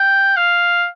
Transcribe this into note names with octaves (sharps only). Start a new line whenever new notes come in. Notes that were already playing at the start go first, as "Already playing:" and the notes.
Already playing: G5
F5